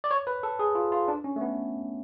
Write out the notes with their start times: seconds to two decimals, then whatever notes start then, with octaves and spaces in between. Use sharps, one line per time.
0.04 D5
0.11 C#5
0.27 B4
0.43 A4
0.59 G#4
0.75 F4
0.92 F4
1.08 D4
1.24 C#4
1.36 A3
1.41 B3